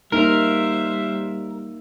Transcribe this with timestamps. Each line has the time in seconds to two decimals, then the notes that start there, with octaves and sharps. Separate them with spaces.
0.12 G3 A#3 D#4 A#4 C5 E5